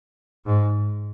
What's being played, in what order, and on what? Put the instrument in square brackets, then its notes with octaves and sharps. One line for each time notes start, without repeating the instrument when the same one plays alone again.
[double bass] G#2